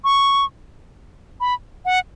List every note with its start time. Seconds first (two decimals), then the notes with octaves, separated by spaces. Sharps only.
0.04 C#6
1.40 B5
1.85 F#5